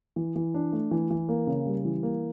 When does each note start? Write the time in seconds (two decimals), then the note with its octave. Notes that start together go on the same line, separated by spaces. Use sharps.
0.16 E3
0.36 E3
0.54 D4
0.73 A3
0.91 E3
1.11 E3
1.29 A#3
1.47 C#3
1.66 G3
1.85 E3
2.03 A#3